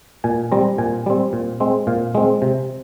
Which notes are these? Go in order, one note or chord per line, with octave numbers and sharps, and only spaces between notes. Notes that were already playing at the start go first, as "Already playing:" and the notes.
A#2 G#5
G3 C4 A#5
A#2 G#5
G3 C4
A#2
G#3 C4
A#2 F5
G#3 C4
C3